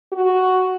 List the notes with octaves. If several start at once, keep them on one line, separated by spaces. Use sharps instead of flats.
F#4